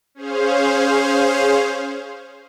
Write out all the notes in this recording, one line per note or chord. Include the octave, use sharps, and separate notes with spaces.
C#4 G#4 C5 F5